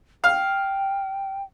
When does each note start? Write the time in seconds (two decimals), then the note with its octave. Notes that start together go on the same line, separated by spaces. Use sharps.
0.24 F5 G5